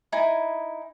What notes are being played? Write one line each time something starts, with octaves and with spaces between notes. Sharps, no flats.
D#4 E4 G#5